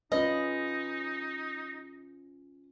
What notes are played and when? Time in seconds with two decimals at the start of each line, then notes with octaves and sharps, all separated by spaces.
0.12 G#3 C#4 D#4 F4 B4 D#5